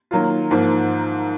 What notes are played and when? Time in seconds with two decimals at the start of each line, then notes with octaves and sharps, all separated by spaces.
0.11 D#3 F#3 A#3 F4
0.50 G#2 F3 A#3